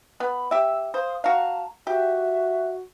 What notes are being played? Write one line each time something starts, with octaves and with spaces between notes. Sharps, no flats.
B3 B5
G4 E5 E6
C5 F5 D#6
F#4 F5 A5 A#5
F#4 G4 E5